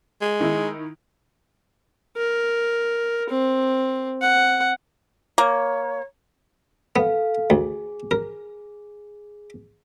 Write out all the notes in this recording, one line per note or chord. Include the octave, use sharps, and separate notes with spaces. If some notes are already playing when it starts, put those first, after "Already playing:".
G#3
D#3 D#4 E4
A#4
C4
F#5
A#3 C#5
B3 A4 F5
D2 G#4
A#4